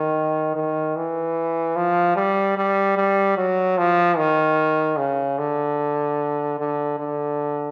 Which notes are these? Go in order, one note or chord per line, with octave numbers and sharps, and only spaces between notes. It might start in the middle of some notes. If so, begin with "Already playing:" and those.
Already playing: D#3
D#3
E3
F3
G3
G3
G3
F#3
F3
D#3
C#3
D3
D3
D3